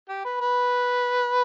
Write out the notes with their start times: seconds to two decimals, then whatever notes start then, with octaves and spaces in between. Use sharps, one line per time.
0.09 G4
0.25 B4
0.41 B4